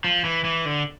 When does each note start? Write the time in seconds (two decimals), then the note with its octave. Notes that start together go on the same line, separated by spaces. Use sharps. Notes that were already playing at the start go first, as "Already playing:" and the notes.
0.04 F3
0.25 E3
0.45 E3
0.65 D3